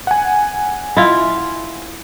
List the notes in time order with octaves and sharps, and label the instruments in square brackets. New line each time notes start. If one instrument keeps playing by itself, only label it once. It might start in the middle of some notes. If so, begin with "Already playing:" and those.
[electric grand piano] F#5 G#5
[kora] E4 F4